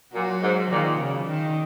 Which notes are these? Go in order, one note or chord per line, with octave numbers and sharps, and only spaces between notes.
A#2 F#3 F#4
G#2
A#2 D#3
C#3
D#3